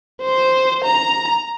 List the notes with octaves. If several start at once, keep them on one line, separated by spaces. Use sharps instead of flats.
C5
A#5